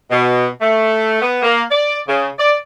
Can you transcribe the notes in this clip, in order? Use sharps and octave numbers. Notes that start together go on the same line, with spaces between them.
B2
A3
B3
A#3
D5
C#3
D5